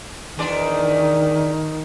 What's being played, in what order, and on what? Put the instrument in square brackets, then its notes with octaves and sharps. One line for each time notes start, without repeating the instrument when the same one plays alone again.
[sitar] E2 D4 D5 [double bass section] D#3